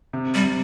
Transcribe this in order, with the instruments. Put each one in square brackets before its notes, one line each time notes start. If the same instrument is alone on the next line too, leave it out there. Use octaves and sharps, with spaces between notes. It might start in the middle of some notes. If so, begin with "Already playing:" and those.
[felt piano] C3
[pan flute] G3
[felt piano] C3